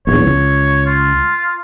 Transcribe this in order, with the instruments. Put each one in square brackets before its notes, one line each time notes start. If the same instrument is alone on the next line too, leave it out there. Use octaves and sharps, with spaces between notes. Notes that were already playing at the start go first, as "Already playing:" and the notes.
[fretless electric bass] A#1 E2 [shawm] C#5
[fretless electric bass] C#2
[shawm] F4